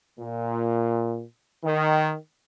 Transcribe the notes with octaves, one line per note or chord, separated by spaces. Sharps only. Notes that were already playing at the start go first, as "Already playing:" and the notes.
A#2
D#3